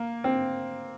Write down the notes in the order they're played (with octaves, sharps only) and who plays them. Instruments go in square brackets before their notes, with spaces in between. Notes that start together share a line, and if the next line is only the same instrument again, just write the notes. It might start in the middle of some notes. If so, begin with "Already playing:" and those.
Already playing: [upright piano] A#3
C4